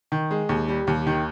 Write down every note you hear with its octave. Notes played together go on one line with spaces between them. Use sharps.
D#3
G#3
D#2
G3
D#2
D#3